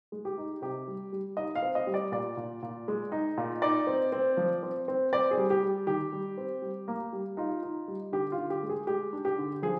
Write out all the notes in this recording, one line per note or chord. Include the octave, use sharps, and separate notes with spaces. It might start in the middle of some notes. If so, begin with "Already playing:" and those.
G#3
G4
D#4
C3 G4
G3
G3
D#4 D#5
F5
C4
D#5
G3
D5
A#2 D5
A#2
A#2
G#3
D#4
A#2
D#4 D5
C4
C4
F3
C4
C4
C4 D5
G#4
G3
G4
G3
D#3 G4
G3
C4
G3
A#3
G3
D#4 F4
D#4
G3
D3 G4
F4
D3
G4
G#3
G#4
G#3 G4
D4
G4
D3
F3 G#4